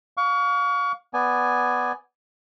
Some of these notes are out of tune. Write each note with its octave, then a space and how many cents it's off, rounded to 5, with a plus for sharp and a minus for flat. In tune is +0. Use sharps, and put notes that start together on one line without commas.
F5 +30 C#6 +35
B3 +5 D5 +0 G#5 +0